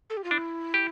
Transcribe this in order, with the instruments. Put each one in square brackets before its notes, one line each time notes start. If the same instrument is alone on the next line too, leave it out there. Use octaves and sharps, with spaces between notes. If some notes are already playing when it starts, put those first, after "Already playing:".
[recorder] A4
G4
F4
[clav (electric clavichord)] D4 [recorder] E4
[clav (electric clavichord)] G4